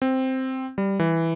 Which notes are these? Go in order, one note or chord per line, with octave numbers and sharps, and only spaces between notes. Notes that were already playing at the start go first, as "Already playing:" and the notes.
C4
G3
E3